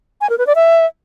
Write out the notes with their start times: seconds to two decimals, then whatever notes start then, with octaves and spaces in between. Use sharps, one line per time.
0.21 G#5
0.29 A#4
0.38 B4
0.47 D5
0.55 E5